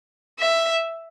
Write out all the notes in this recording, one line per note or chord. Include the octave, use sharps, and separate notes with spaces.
E5